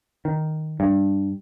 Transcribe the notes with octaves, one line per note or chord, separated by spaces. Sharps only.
D#3
G2